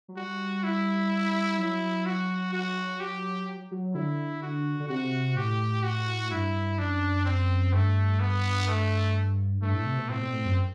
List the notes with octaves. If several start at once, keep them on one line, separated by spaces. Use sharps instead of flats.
F#3
G3 F#4
E4
F#3 E4
F#4
F#4
G4
F#3
D3 E4
F#4
D3
C3 F#4
A2 G4
F#4
G2 E4
F#2 D4
C4
G2 A3
B3
A3
G2 A3
A2
C3
B2
A2 C4
B2
A2
F#2